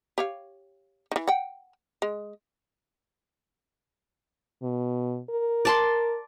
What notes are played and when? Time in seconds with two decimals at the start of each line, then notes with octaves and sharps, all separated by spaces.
0.18 G4 C#5 F5
1.11 D#3 E3
1.27 F#5 G5
2.02 G#3
4.63 B2
5.30 A#4
5.65 D5 A5 C6